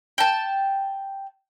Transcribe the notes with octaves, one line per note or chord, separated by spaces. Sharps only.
G5 A5